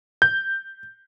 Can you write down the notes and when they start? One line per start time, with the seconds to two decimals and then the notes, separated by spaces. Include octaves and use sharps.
0.22 G6